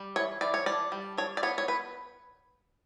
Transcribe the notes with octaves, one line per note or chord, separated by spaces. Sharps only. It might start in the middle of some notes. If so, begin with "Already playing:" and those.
Already playing: G3
E3 C#5
E3 D5
C#5
D4 D5
G3
D4 C#5
D5
B3 C#5
C#5
B4